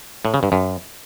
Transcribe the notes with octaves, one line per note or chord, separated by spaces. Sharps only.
A2
C#3
G2
F#2